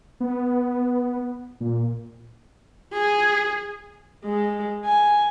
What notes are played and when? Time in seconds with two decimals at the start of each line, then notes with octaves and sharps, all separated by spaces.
0.20 B3
1.60 A#2
2.93 G#4
4.24 G#3
4.85 G#5